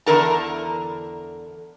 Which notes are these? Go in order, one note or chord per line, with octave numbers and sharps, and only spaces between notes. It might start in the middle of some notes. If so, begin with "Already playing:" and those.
E2 D3 A#4 A5